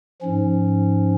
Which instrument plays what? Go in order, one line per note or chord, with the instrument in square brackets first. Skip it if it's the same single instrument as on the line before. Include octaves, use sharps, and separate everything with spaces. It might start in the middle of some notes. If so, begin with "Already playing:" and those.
[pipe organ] G#2 F3 C#4